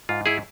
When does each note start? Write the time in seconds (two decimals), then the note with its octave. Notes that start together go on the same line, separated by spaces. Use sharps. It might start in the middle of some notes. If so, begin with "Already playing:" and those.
0.09 G#2 F4
0.26 E4 G#4